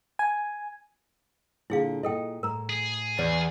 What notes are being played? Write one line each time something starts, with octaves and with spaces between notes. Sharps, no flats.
G#5
A#2 D3 E4 G#4 F5
A#2 E4 A4 D#5 G5
A2 A#4 A#5
G#4
E2 D5